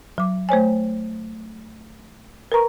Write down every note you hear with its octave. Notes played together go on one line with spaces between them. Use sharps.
F#3 D6
A3 C5 C#5 G#5
A#4 B4 A#5 C#6